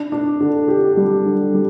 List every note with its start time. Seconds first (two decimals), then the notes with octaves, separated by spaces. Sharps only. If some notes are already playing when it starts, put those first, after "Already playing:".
Already playing: D4
0.12 D4
0.40 D3
0.68 G4
0.97 G3
1.26 D3
1.54 G3